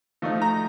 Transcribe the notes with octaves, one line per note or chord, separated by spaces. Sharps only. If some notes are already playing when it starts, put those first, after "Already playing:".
F3 A3 D#4
A#5